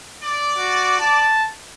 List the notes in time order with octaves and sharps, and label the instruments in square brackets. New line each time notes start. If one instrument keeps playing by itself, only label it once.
[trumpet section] D5
[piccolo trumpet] F#4
A5